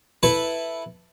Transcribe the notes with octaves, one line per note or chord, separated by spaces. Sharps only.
E4 A4 B4